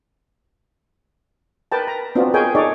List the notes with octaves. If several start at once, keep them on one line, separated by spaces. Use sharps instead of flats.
A#4 B4 G5 A5
A#5
B3 C4 D4 F4 F#4
G#4 A#4 C#5 D#5 G5 G#5
D#4 G#4 A4 C#5 D5